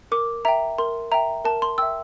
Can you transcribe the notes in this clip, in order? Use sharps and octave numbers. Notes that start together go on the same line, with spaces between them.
A#4 D6
E5 G5 A#5
A#4 C6
E5 G5 A#5
A#4 A5
C6
E5 G5 E6